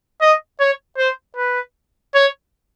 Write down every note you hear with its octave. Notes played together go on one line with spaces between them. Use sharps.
D#5
C#5
C5
B4
C#5